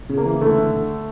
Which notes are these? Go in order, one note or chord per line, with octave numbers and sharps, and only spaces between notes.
C#3
A#3
E3
D3 A3
D3
D3